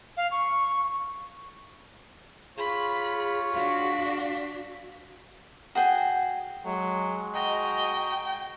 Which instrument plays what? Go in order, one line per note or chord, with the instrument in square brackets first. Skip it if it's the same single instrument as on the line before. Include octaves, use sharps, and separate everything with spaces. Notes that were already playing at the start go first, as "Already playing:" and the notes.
[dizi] F5
C#6
[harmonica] F4 C#5 [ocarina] G#4 [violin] B5
[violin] D4 B6 [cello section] F#4 [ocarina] F5
[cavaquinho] F#4 G#4 G5
[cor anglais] F#3 [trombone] G#3
[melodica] F#4 A#5 D#6 [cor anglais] D#5 [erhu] G5